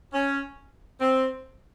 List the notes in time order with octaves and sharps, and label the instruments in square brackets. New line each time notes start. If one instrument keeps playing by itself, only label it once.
[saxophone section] C#4
C4